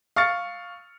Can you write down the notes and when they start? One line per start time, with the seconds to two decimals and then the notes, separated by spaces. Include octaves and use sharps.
0.16 F5 C#6 F6 A6 C#7